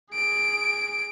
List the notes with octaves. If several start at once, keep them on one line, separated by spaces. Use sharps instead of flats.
G#4 D7